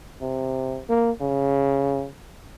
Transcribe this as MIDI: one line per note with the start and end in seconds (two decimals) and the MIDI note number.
0.21 0.80 48
0.89 1.11 58
1.21 2.06 49